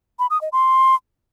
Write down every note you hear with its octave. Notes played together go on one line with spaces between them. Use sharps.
B5
D#6
D#5
C6